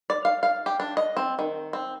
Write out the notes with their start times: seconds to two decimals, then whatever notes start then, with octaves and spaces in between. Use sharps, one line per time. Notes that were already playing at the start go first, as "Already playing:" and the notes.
0.10 D5
0.25 F5
0.43 F5
0.66 G4
0.80 D4
0.97 D#5
1.17 C4
1.39 D#3
1.73 C4